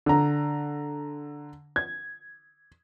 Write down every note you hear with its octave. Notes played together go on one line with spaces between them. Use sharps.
D3 A#5
G#6